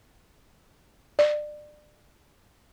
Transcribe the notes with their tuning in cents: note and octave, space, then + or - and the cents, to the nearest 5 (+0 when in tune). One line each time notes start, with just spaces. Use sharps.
D5 +25